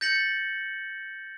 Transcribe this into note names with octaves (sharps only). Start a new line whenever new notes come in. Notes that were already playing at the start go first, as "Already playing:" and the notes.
G6 A6 A#6 C#7 F#7